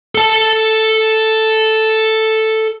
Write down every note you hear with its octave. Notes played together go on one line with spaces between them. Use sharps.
A4 A5